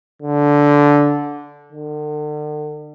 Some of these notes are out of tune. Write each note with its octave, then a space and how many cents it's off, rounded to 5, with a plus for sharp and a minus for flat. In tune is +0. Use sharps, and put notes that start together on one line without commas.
D3 -10
D3 +40